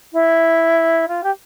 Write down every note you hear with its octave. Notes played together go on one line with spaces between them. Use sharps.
E4
F4
G4